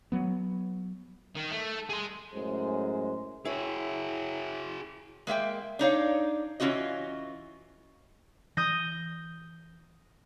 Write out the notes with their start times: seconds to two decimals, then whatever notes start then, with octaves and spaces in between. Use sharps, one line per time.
0.12 F#3 B3
1.36 D#3
1.51 A3
1.90 G#4 C6
2.35 F#2 A2 G#3 C5
3.45 E4 F#4 G#4 C#5
5.27 G#3 A#3 E5 G5
5.79 D4 D#4 C#5 F5
6.60 E3 A3 C#4 F4 F#4 D#5
8.57 E3 D#6 G6 A#6